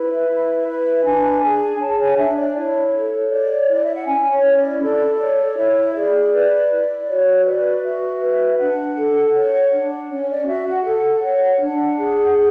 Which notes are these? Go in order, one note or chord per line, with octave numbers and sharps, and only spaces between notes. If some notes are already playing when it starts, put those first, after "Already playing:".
Already playing: E4 B4
E5
E4
B4
D4 G#5
G#4 G#5
C#5 A5
G#5
F#5
D4 E5
D5
E4 C#5
A4
C#5 D5
E4 D5
E5
F#5
C#4 G#5
C#5
E4
D5
A4 D5
C#5
E4 E5
G#4 D5
B4
E4
F#4 C#5
B4 D5
F#4 E5
B4
D4 F#5
A4
C#5
D4
C#4 C#5
D5
F#4 E5
F#5
A4
C#5
D4
G#4
F#5